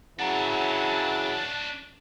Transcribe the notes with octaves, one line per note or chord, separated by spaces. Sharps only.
C#3 E3 F#3 D4 C#5 F#5 A5 A#5